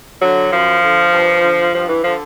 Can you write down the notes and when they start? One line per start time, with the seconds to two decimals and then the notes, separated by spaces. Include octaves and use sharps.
0.21 D3 F#3
0.52 F#2 F3
0.82 D3
1.12 G2
1.42 D3
1.73 G2 F3
1.88 E3
2.03 D3 F3